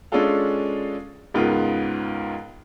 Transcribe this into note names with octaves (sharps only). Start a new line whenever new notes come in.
G#3 C#4 D4 F4 A4 F5
C#2 G#2 B3 F4 A#4